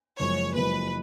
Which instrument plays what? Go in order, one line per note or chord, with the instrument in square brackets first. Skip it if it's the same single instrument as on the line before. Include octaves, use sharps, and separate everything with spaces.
[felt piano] F#1 F#2 F3 G#3 [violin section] C#5
[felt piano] F#1 F#2 F3 G#3 [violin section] B4